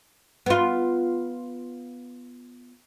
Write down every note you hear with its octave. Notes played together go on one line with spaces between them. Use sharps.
B3 F4